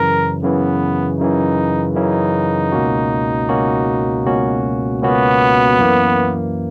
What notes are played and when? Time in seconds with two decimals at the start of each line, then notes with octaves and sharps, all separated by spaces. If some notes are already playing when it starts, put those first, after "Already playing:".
Already playing: F#2 C#3 E3 A#4
0.42 F#2 C#3 E3 B3
1.19 F#2 C#3 E3 D#4
1.96 F#2 C#3 E3 D#4
2.72 C#2 B2 A#3 C#4 F#4
3.48 C#2 B2 A#3 C#4 F#4
4.26 C#2 B2 A#3 C#4 F#4
5.01 C#2 B2 A#3 B3 C#4 F#4
5.78 F#2 E3 A#3